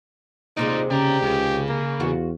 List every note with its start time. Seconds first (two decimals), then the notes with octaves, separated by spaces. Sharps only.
0.57 D#2 C3 G#3 D#4 F4 D5
0.91 C#3 G4 D5 A#5
1.22 C#2 C#3
1.68 A#3
2.00 E2 F4 F#4